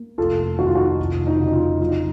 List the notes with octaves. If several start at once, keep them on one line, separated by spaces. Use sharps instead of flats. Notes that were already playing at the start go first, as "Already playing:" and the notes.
Already playing: A#3
F1 F4 A4
D#3 F#4
F4
D#4 F#4
F1
D#4
C#3
D#4
F4
F#3 F4
D#4